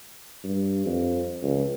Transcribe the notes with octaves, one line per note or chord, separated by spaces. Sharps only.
G2
F2
C#2